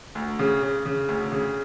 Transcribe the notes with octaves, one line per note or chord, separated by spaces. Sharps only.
D2
C#3
C#3
C#3
D2
C#3